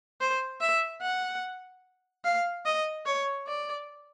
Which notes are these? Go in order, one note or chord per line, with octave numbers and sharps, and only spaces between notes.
C5
E5
F#5
F5
D#5
C#5
D5